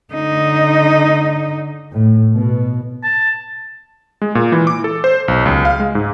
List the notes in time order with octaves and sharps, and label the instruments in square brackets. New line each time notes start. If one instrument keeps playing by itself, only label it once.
[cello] D3 D#4
[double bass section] A2
B2
[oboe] A5
[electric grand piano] G#3
A#2
E3
D6
A4
C5
B1
C#2
F5
G#3
G#2